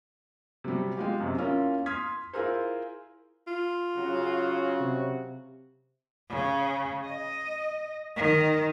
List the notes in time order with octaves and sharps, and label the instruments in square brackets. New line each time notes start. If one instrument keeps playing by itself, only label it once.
[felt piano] C3 F#3 G3
G#3 F4 G4
F#2 C3
A#3 C#4 E4 F4
C6 D#6 F6 G#6 B6
E4 F4 G#4 A#4 C5
[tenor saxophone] F4
[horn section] C#3 F#3 F#4
[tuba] C3
[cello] C#3
D#5
D#3